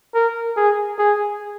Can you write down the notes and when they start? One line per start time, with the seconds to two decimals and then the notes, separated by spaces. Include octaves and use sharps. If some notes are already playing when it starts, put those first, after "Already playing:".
0.15 A#4
0.56 G#4
0.99 G#4